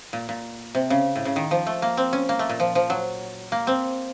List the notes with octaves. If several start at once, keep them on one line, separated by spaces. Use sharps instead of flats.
A#2
A#2
C3
C#3
A2
C#3
D#3
F3
A3
A#3
C4
C#4
A#3
A3
A#2
F3
F3
F#3
A#3
C4